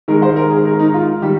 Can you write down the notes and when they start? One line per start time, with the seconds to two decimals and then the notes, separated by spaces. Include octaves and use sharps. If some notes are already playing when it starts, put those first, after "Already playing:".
0.08 D#3 G#3 A#4
0.22 C5
0.36 A#4
0.50 G#4
0.65 A#4
0.79 D#4
0.89 D#4
0.94 F4
1.22 D#3 G3 G4